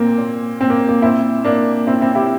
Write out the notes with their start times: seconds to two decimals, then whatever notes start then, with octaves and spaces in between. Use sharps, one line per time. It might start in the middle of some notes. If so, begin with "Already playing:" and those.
Already playing: A#2 A#3 C4
0.18 A#2
0.61 A#2 C4
0.70 A#3
0.89 A#3
1.02 A#2 C4 E4
1.44 A#2 A#3 D4
1.87 A#2 C4 E4
2.01 C4 E4
2.15 E4 G4